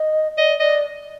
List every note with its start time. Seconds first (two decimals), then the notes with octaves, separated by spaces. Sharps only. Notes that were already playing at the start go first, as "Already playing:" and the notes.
Already playing: D#5
0.37 D5 D#5
0.60 D5 D#5